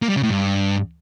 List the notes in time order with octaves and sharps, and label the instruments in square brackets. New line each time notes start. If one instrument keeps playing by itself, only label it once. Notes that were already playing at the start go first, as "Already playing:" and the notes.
[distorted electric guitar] A#3
G3
C#3
A2
G2